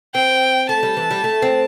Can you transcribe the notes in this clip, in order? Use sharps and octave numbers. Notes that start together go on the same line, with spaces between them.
C4 G5
A3 A5
G3
E3
G3
A3
C4